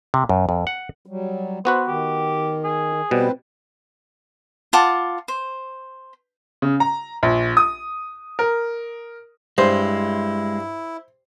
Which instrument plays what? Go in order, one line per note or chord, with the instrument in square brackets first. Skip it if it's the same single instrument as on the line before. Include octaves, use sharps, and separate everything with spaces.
[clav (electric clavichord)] C3
F#2
F2
F#5
[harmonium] F#3 G3
[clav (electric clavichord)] B3 F#4 B4 [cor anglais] C5
[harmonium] D#3 [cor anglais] G4
[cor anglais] G#4
[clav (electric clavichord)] B2 G3 [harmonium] C4 B4 C5
[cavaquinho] F4 F#5 A5 D6
C5
[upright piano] C#3
A#5
A#1
D#6
A#4
[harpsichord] G2 [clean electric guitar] G#3 [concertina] E4 [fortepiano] C5